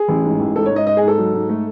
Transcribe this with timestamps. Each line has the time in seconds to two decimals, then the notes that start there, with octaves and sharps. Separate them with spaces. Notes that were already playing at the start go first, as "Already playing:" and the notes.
Already playing: G#4
0.08 A1
0.24 G#2
0.39 A1
0.56 G#2 A4
0.66 C#5
0.71 G#2
0.76 D#5
0.86 G#2 D#5
0.97 G#4
1.03 G#2 A4
1.18 F#3
1.34 G#2
1.49 A3